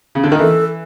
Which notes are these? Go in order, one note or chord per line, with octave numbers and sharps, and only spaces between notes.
C#3
D3
D#3
E3 A4